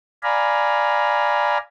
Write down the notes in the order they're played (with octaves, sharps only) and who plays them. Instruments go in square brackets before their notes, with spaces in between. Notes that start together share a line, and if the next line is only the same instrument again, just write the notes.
[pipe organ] D5 F5 G#5 A#5 B5